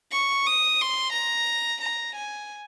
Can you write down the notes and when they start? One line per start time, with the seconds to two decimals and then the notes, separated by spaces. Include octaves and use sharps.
0.12 C#6
0.47 D#6
0.81 C6
1.13 A#5
1.82 A#5
2.16 G#5